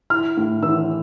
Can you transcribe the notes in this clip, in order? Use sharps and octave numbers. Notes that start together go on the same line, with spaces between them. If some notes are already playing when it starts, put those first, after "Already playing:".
E4 F6
A2
E3 E6